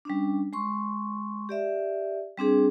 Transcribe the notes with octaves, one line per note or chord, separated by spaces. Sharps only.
G3 C#4 D4
G#3 C6 C#6
G4 D5 E5
G3 C4 D4 G#4